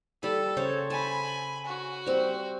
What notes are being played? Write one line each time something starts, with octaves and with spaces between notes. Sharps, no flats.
G3 A4 B5
C#3 C5 C#5
G#5 A5 B5
F#4
G3 C4